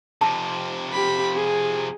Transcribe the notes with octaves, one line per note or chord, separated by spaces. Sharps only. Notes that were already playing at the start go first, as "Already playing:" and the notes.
F2 C3 A5
G4 B5
G#4